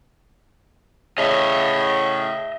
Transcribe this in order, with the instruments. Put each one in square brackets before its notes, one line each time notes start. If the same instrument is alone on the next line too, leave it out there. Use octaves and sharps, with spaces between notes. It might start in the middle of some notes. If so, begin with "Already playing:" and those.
[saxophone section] A2 C#3 [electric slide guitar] D#5 E5